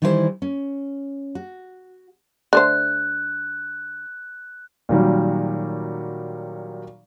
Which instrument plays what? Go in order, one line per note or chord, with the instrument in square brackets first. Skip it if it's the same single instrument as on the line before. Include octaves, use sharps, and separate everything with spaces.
[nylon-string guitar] D#3 E3 G3 E4 G4 C5
C#4
F#4
[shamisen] D3 A3 C5 [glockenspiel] F#6
[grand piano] A#2 D#3 F#3 G3